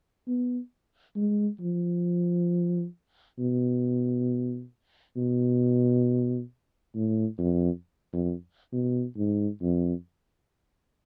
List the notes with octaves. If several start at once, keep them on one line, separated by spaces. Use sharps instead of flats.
B3
G#3
F3
B2
B2
A2
F2
F2
B2
G#2
F2